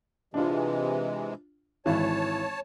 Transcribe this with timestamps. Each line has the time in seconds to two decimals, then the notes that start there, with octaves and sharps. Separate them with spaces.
0.34 C3 E3 G#3 D4 F4
1.86 G#1 E3 C#5 A5